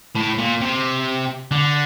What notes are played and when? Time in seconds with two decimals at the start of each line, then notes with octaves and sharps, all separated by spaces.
0.16 A2
0.39 A#2
0.61 C3
1.51 D3